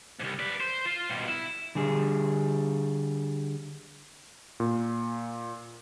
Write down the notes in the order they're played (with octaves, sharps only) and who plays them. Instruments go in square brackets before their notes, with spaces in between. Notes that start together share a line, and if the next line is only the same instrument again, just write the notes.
[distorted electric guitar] C2 G#2
B4 D5
C5
F4
B2 G3
E4
[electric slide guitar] D3 G3 G#4
[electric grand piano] A#2